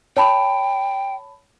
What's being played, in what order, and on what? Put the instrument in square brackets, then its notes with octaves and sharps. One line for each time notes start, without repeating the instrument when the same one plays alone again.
[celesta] C#5 A5 B5 [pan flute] G5